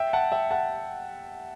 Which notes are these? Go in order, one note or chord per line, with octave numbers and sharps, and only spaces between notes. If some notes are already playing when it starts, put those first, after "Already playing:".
Already playing: E5 G5
F#5 A5
E5 G5
F#5 A5